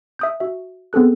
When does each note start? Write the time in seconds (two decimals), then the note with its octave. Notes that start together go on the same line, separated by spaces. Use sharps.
0.19 E5 D#6 G6
0.40 F#4 E5
0.93 B3 C4 G#4 A4 F#6